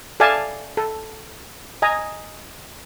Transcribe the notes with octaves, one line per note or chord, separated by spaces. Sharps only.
A4 D5 E5 F5 G#5 A5
A4
D#5 G#5 A#5